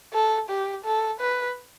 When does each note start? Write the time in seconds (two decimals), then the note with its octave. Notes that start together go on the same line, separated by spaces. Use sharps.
0.13 A4
0.49 G4
0.85 A4
1.20 B4